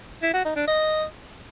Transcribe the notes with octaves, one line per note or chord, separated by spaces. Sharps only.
E4
F#4
D#4
D4
D#5